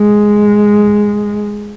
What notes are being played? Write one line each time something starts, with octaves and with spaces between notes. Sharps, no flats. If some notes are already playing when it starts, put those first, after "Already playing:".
Already playing: G#3